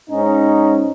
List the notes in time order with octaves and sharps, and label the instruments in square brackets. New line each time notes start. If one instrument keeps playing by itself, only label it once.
[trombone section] G#2 C#4 D#4